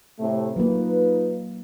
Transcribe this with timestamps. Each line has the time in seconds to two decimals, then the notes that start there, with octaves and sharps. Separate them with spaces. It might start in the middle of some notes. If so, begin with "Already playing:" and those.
0.19 A2 C3 A3
0.56 F#3 A#3 D#4 F4 B4